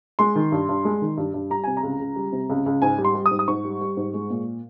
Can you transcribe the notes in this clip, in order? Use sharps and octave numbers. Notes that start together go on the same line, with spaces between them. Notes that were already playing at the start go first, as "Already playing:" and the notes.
G#3 C6
D#3
G2
G2
G#3
D#3
G2
G2
G3 A#5
C3 G#5
A#5
C#2
C#2
G3
C3
C#2
C#2
G#2 G#5
G3
C6
G3
D#6
G#2
D#6
G#2 C#6
G3
G3
G#2
G#3
A#2